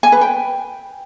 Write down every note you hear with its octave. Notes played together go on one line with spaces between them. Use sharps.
G#5
B4
G5